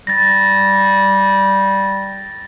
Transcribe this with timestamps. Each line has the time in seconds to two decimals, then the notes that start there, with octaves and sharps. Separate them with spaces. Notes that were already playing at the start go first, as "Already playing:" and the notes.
0.07 G3 A6 A#6